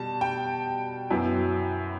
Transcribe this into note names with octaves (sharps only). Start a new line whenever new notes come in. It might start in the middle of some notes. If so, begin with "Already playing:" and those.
Already playing: B2 G3 A5
G5
F#2 F#3 B3 E4